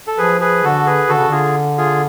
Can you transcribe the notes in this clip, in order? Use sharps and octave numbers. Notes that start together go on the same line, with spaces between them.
A4
F3 G#4 B4
G#4 B4
D3 F#4 A4
G#4 B4
D3 F#4 A4
C#3
D3 F4 G#4
F4 G#4